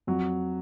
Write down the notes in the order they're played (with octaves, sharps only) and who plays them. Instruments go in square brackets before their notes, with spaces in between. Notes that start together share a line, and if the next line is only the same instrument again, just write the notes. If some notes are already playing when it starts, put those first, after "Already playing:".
[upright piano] F2 [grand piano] F#3